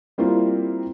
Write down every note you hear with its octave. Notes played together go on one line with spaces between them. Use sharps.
G3 A#3 C4 E4 F4